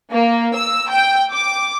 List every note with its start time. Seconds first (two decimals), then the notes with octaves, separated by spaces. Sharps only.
0.12 A#3
0.54 E6
0.89 G5
1.32 D6